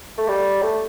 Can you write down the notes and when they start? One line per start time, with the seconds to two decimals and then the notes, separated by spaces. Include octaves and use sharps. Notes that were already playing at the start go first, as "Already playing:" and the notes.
0.18 A3
0.28 G3
0.62 A3